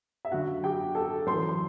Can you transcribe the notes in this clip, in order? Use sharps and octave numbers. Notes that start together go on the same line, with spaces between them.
E5
F#2 D3 F#4 F#5
G4 G5
A4 A5
F#2 E3 C5 C6
C6